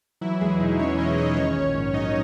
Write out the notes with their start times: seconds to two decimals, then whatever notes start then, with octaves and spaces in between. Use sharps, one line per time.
0.21 E3 F#3 E4
0.41 E2 G#3 G#4
0.60 B2 D#4
0.79 E2 C#4 C#5
0.98 F#3 D#4 D#5
1.17 E2 D#4 D#5
1.36 D#3 C#4 C#5
1.56 A#1
1.75 G#2
1.94 F#3 D#4 D#5